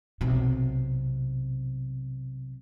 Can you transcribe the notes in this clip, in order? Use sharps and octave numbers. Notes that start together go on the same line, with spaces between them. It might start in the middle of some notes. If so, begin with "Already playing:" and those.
B1 C3